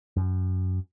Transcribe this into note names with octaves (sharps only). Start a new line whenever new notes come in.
F#2